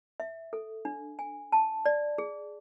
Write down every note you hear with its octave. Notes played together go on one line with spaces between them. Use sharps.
E5
A4
D4
G#5
A5
D5
G#4